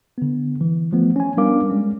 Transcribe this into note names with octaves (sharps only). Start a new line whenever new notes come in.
D3 B3
E3
F3 A3 B3
C#4 G#5
G3 B3 D4 A#4 F5 D6
G3 G#3 C#4